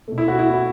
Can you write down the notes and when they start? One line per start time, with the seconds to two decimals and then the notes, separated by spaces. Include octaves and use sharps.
0.08 B2 A3
0.18 E4
0.28 F#4
0.39 E4
0.54 F#4